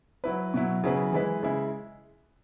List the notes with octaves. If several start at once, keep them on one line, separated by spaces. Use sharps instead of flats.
F#3 E4 B4
B2 F#3 E4
C#3 F#3 E4 G#4 B4
E3 G#3 E4 B4
C#3 G#3 E4